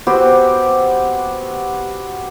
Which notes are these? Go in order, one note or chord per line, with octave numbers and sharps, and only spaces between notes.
B3 C4 F#4 G4